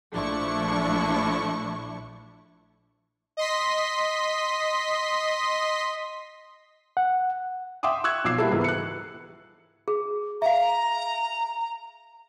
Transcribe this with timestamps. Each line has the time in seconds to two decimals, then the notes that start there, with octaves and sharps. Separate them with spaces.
0.12 A#1 F3 A3 D4 E4 C#6
3.37 D#5 C6 B6
6.97 F#5
7.83 E5 G5 C6 D6 D#6
8.04 C#6 E6 F#6 G#6
8.24 B1 F3 D6 E6 C7
8.38 G3 A#3 E4 F#4 A4
8.51 C#2 G#2 E3 B3
8.64 F#6 C#7
9.88 G#4
10.42 E5 F5 A#5